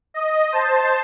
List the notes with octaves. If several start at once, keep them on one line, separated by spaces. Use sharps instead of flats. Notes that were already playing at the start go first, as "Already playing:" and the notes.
D#5
C5 A5